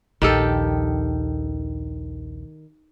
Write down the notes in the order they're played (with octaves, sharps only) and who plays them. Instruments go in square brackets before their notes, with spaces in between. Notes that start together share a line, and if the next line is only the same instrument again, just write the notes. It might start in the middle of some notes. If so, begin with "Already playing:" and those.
[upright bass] A#1 D#2 [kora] D#3 G4 A4